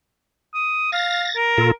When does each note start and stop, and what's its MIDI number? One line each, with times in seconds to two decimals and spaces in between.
0.54 0.88 87
0.92 1.26 77
0.92 1.37 93
0.92 1.37 94
1.36 1.69 70
1.58 1.71 46
1.58 1.71 65
1.58 1.71 69